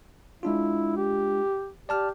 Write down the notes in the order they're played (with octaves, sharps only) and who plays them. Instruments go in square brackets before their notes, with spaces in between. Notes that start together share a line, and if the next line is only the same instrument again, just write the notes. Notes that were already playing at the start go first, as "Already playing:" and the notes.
[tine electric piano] G#3 D4 F4 [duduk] E4
[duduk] G4
[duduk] G4 [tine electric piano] D5 A5 F6